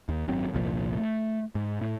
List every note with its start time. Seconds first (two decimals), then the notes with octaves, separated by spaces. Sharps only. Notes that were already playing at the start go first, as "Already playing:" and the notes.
0.09 D#2
0.28 G#1 F#2 F#3 C4
0.53 G1 C2 A#2 F3
0.96 A3
1.55 G#2
1.81 A2